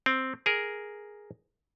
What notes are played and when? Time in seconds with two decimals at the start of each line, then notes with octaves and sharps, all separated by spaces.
0.06 C4
0.46 G#4 A#4